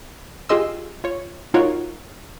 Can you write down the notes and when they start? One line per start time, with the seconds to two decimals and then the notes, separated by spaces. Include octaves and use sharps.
0.49 F4 G4 G#4 D#5 C6 E6
1.04 F4 C#5
1.54 D#4 F4 F#4 A#4 C#5